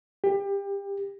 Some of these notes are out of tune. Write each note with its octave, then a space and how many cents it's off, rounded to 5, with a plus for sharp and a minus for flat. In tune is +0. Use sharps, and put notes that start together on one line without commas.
G4 +25